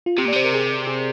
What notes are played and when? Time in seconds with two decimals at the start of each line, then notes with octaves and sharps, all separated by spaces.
0.06 F4
0.18 C3 G4
0.25 A#2
0.28 D5
0.32 C3 C5
0.44 A#4
0.53 G#4
0.87 G#4